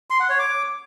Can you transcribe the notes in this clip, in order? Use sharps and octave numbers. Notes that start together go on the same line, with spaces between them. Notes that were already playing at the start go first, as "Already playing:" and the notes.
C6
F#5
C#5
D6